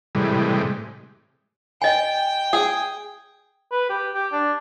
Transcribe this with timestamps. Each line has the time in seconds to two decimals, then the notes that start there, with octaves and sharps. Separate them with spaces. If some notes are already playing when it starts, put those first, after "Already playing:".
0.15 A2 C3 E3 G3 G#3
1.82 D#5 G5 G#5
2.53 G#4
3.71 B4
3.89 G4
4.14 G4
4.32 D4